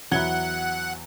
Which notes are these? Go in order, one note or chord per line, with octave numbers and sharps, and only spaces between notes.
E2 F#3 E5 F#5 B5 G#6 G7